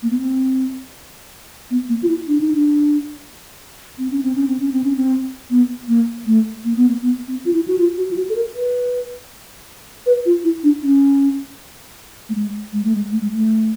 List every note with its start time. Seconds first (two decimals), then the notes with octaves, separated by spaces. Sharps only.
0.03 A#3
0.11 B3
0.18 C4
1.71 B3
1.89 A#3
2.03 F4
2.08 E4
2.28 D4
2.41 D#4
2.54 D4
3.99 C4
4.11 C#4
4.23 C4
4.35 C#4
4.47 C4
4.60 C#4
4.72 C4
4.84 C#4
4.96 C4
5.51 B3
5.88 A#3
6.26 A3
6.65 A#3
6.76 B3
6.89 A#3
7.02 B3
7.28 C4
7.45 F4
7.53 E4
7.68 F#4
7.79 F4
7.98 F#4
8.11 F4
8.16 F#4
8.29 A4
8.36 A#4
8.55 B4
10.06 B4
10.26 F4
10.44 E4
10.64 D4
10.83 C#4
12.29 A3
12.35 G#3
12.73 G#3
12.84 A3
12.95 G#3
13.11 A3
13.21 G#3
13.32 A3